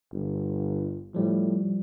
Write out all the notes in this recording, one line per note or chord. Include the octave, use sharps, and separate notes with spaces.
G1
A2 F3 G3